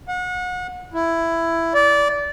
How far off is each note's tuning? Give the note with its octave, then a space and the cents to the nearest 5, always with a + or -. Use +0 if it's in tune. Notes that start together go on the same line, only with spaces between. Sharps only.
F#5 -35
E4 +10
D5 -20